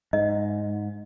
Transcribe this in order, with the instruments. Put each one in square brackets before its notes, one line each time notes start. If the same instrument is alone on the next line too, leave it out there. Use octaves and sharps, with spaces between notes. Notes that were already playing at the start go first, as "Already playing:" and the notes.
[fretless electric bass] G#2 [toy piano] D#5